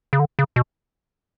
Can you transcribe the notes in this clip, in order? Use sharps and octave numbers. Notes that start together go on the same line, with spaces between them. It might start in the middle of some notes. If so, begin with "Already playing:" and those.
C#3
D3
C#3
B2